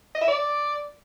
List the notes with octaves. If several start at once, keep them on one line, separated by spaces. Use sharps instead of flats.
D#5
E5
D5